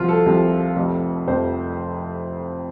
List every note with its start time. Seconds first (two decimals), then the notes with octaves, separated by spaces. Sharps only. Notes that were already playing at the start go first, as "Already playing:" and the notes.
Already playing: C2 C3 F3 F4 F#4
0.09 A4
0.26 C2 C3 F3
0.76 F1 F2 C3
1.26 F1 F2 C3 C5